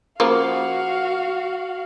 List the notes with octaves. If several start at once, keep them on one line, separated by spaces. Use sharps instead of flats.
C#3 F3 A#3 F#4 F5